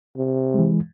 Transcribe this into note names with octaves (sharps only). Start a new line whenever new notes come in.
C3
E3 G#3